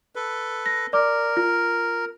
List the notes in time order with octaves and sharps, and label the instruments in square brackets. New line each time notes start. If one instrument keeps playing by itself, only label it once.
[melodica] A4 B4
[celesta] A#6
[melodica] A#4 [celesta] D5 D6
[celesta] F4